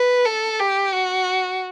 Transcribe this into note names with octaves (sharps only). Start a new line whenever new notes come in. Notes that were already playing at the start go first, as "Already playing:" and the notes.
Already playing: B4
A4
G4
F#4